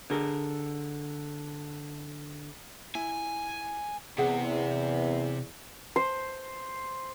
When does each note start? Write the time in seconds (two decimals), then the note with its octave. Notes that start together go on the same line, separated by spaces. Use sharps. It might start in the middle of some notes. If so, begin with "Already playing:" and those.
0.10 D3 G#4 A#4
2.95 E4 G#5
4.18 E2 C3 G#4 F#5
5.96 C5